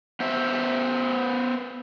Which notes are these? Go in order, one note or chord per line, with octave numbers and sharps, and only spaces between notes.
B3 C5 E5